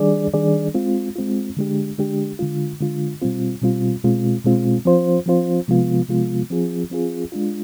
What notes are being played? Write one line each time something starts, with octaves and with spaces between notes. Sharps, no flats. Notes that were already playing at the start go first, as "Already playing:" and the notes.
Already playing: D#3 G3 D4 G#4 D5
D#3 G3 D4 G#4 D5
G#3 C4 F4
G#3 C4 F4
D3 G#3 D4 G4
D3 G#3 D4 G4
D3 G#3 D4 F4
D3 G#3 D4 F4
B2 G3 C4 F4
B2 G3 C4 F4
B2 G#3 C4 F4
B2 G#3 C4 F4
F3 C4 F4 C5
F3 C4 F4 C5
C3 F3 G#3 B3 F4
C3 F3 G#3 B3 F4
F3 C4 F4 G#4
F3 C4 F4 G#4
G#3 D4 F4